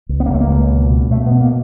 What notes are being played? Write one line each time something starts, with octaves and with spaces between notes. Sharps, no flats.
C#2
B3
A#3
C#2 A3
A#3
C#2
B2
B2
B2 A3
B2 B3
A#3